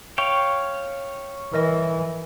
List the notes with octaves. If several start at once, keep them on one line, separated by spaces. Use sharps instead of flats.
C#5 F5 G5 F7
E3 A#4 D#5 A#6